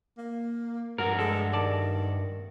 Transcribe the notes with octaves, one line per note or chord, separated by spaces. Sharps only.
A#3
G2 F#4 A#4
G#3 A4
D#3 D5 A5